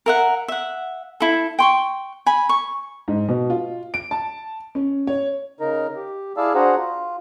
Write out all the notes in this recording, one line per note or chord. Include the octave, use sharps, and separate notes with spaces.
A#4 E5 F#5
E5 F#5
E4 A4
G5 C6 C#6
G#5 B5
C#6
G#2
B2
F4
D7
A5
C#4
C#5
C#3 D#4 A#4 A#5
G4
E4 G#4 D5 F5 A5 E6
D4 F#4 G#4 C5 F#5 A#5
F4